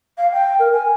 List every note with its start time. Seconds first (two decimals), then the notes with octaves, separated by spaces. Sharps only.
0.18 F5
0.32 G5
0.59 A#4
0.73 G#5